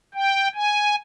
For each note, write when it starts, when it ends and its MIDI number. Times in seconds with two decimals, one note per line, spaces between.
0.14 0.48 79
0.54 0.95 80